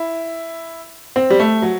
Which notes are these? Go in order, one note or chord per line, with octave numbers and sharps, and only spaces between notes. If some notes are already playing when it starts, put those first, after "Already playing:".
Already playing: E4
C4
G3
A3
F#3